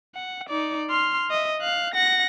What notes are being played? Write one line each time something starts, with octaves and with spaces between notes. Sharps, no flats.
F#5
D#4 D5
C6 F6
D#5 E5
F5 F#6
F#5 A#6